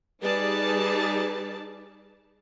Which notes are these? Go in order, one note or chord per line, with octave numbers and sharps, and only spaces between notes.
G3 D#4 G#4 B4 D5 A5